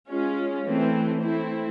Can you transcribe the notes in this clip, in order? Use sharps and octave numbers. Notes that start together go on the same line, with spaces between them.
G#3 C#4 F4
E3 A3 C4
A3 C4 E4